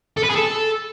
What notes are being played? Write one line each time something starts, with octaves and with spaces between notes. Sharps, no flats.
A4
B4
G#4
A4